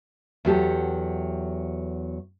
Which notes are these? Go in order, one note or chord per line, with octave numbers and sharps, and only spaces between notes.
E2 F#3 G4 A4